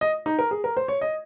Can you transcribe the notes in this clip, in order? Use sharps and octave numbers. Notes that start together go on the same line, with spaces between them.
D#5
D#4
A#4
G#4
A#4
C5
C#5
D#5